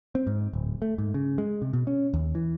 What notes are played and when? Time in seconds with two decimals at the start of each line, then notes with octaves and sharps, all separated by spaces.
0.15 C4
0.27 G#2
0.53 D1
0.82 A3
0.98 G#2
1.14 C#3
1.38 G#3
1.62 C3
1.73 B2
1.87 C#4
2.14 D#2
2.35 E3